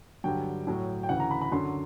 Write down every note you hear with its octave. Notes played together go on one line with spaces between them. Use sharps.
G2 D3 F#3 G5
A2 F#3
G5
D2 C#3 E3 F#5
A#5
B5
B5
F#2 D3 F#3 C6